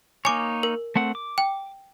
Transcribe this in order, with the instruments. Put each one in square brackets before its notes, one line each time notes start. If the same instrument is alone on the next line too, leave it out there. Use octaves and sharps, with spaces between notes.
[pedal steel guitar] A#3 D#4 C#5 [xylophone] G#5 D6
[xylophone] A#4
[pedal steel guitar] A3 C4 F#5
D6
[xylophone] G5